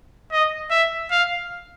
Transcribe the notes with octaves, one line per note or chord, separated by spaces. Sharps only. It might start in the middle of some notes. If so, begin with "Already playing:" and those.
D#5
E5
F5